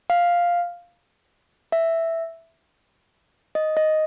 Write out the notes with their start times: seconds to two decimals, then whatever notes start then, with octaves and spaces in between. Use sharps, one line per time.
0.10 F5
1.72 E5
3.55 D#5
3.77 D#5